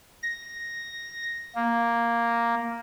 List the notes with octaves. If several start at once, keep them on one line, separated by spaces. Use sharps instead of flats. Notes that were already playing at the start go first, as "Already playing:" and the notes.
A#6
A#3